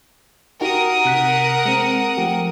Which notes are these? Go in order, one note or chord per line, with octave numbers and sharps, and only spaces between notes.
D#4 F#4 G4 A#4 F#5 D#6
C3 F#6 B6
G#3 C4
F3 A3 G4